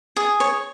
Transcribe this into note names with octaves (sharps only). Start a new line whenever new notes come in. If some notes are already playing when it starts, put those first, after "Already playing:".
G#4
C#5